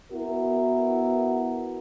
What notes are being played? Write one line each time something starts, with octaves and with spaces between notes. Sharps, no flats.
B3 E4 F#4 A#4